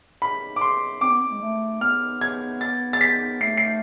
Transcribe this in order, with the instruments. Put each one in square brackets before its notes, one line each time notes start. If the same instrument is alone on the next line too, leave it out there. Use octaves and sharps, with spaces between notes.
[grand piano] B5
D6
C6
[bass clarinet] C4 [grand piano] D6
[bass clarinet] B3
C4
G#3
A3
[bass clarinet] B3 [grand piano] F6
[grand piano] G#6
A6
A6
B6
[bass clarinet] A3 [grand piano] C7
[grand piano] C7